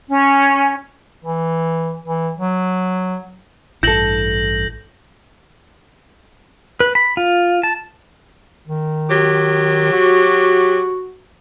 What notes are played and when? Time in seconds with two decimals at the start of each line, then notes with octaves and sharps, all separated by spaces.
0.08 C#4
1.24 E3
2.06 E3
2.37 F#3
3.83 A1 G2 E4 A4 G6 A#6 F#7
6.80 B4
6.95 B5
7.17 F4
7.63 A5
8.68 D#3
9.10 F#3 G4
9.93 F#4